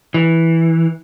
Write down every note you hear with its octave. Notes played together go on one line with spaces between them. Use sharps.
E3